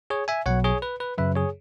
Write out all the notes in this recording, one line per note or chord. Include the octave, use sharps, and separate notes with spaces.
G#4 C#5
E5 G#5
B1 B2 F#3 C#5 F#5
G#4 C#5
B4
B4
F#2 C#3 F#3 B4 E5
G#4 C#5